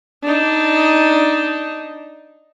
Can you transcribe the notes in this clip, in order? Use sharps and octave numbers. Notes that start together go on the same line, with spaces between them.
D4 D#4